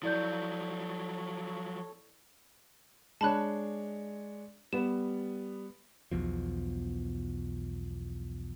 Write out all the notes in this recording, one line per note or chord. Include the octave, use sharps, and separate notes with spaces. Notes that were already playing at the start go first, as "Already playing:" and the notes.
F3 F#3 E4 A4 C#5 D5 G6
G#3 D4 C#5 A5 B5 F#6
G3 B3 E7
B1 E2 B2 F3